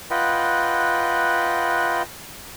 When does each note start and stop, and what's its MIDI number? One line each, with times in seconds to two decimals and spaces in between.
0.11 2.02 65
0.11 2.02 71
0.11 2.02 75
0.11 2.02 78
0.11 2.02 79
0.11 2.02 83